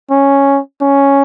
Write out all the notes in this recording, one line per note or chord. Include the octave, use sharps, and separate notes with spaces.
C#4
C#4